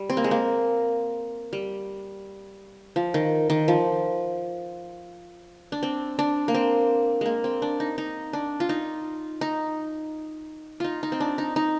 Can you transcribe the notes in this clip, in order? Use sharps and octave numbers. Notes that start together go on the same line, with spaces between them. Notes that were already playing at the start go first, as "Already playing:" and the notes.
Already playing: G3
C4
A#3
G#3
A#3
G3
F3
D#3
D#3
F3
D4
C4
D4
A#3
C4
G#3 A#3
C4
D4
D#4
D#4
D4
F4
D#4
D#4
D#4 F4
D#4
C4
D4
D#4
D#4